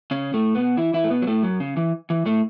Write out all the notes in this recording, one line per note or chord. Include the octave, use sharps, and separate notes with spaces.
C#3 C#4
A2 A3
B2 B3
E3 E4
E3 E4
A3
B2 B3
F#3
A2 A3
F#2 F#3
C#3
E3
E3
A2 A3